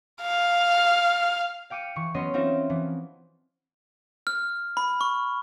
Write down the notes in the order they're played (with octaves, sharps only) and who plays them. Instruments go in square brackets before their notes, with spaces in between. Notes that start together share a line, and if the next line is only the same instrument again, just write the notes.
[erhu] F5
[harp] F5 G5 D6 C#7 D#7
E3 C#6
F#3 B3 C#4 C#5 D#5 C6
C4 D#4 F4 E5
E3 F3
[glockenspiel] F6
B5
C#6